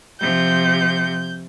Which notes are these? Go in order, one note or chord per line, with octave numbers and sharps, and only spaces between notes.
C3 F3 G6